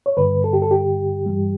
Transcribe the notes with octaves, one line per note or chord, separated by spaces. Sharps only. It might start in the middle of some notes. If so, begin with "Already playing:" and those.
C#5
G2 D3 G3 B4
A4
G4
A4
G4
G2 E3 G3